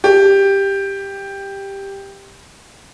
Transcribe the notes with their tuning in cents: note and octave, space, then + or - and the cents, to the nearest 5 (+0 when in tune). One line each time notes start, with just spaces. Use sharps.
G4 +5